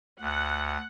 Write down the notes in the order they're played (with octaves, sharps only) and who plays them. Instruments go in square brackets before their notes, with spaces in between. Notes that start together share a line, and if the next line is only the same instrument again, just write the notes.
[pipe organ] D2 [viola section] F#5